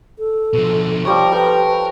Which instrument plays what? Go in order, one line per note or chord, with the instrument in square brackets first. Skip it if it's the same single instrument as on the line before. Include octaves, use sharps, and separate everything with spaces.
[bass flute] A4
[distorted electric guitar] B2 F3
[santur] F3 G3 C#5 [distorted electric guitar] A#4
[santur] A4 G5 B5 [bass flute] B4